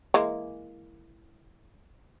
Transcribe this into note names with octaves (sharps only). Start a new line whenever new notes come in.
E3 G#3 A#3